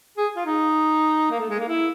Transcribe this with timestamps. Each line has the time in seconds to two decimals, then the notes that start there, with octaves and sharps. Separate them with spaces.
0.17 G#4
0.36 F4
0.45 D#4
1.31 A#3
1.40 A3
1.49 G#3
1.59 A#3
1.68 E4